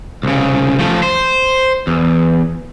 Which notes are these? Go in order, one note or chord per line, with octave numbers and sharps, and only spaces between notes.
C2 C#3
F3 A3
C5
E2